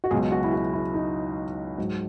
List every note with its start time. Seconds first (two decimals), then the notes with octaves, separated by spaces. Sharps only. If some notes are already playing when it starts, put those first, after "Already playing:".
0.04 F#4
0.11 C#2 B2 F#3 G#4
0.32 F#4
0.44 E4
0.53 F#4
0.74 E4
0.94 D#4
1.78 G#2 F#3